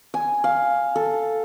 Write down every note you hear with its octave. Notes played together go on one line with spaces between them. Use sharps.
G#5
F5
A4